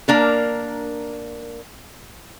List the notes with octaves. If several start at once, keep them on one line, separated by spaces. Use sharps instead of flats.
A#3 D4 A#4